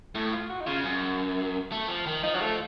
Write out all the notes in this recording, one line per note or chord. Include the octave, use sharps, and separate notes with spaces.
A2 A3
F4
F#4
D#4
C#3 F4
F#2
A3
F3
D#3
F3 D#4
F#3
A3